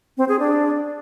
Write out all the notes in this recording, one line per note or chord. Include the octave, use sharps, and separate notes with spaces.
C4
G#4
D4